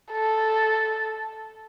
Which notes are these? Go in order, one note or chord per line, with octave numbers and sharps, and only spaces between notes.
A4